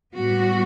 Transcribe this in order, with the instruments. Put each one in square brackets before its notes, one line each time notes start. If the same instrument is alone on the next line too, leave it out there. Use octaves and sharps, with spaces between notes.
[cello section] A2 G3 B3 F#4